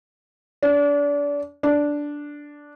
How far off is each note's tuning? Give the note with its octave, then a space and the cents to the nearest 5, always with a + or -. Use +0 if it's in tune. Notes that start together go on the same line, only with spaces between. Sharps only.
D4 -30
D4 -5